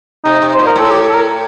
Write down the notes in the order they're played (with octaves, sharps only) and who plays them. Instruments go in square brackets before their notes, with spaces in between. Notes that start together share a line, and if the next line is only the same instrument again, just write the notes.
[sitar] C3 [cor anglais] D#4
[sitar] C3
[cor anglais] C5
[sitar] A#2
[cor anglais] A#4
[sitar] A2 [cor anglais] A4
[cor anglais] G4
A4
A#4